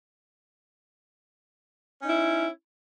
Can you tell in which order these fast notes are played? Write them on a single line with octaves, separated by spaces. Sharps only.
C#4 D#4 E4